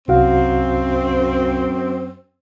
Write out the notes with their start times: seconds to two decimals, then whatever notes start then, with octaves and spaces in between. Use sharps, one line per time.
0.08 C2 F#2 C4 F#4 F5